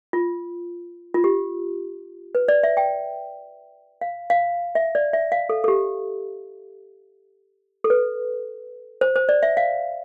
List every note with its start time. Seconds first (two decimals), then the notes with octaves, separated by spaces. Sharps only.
0.13 F4
1.14 F4
1.24 G4
2.35 B4
2.48 D5
2.63 E5
2.77 G5
4.01 F5
4.30 F5
4.75 E5
4.95 D5
5.13 E5
5.32 F5
5.49 A4
5.64 A4
5.68 G4
7.84 A4
7.90 B4
9.01 C5
9.16 C5
9.29 D5
9.43 E5
9.57 F5